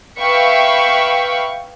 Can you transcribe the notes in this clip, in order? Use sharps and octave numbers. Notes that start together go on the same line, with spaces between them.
B4 E5 F5 G5 B5 C#6